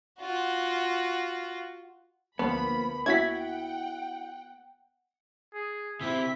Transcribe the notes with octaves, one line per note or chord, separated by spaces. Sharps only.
F4 F#4
D2 F3 A#3 B3 B4 B5
E4 F#4 F#5 G5 G#6 B6
G#4
C3 C4 E4 E5 B6